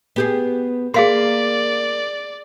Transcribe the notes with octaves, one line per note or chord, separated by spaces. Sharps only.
B3 G4 G#4
A#3 G#4 D5 F5 C6